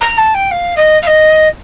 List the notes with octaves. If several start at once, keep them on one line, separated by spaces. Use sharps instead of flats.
A#5
A5
G5
F5
D#5
F5
D#5